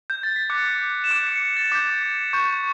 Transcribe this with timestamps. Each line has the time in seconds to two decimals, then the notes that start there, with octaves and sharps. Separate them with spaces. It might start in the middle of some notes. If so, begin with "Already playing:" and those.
0.10 G6
0.23 A6
0.36 B6
0.50 D6 F#6 C#7
1.04 E7
1.11 D6 F#6 D7
1.27 C#7
1.42 A6
1.56 A6
1.72 D6 G6 B6
2.33 C#6 G6